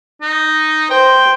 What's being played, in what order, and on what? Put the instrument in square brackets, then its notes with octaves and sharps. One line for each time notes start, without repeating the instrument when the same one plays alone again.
[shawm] D#4
[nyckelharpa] C5 [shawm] G5